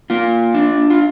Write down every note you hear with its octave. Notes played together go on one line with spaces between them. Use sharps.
A#3 F4
D4
F4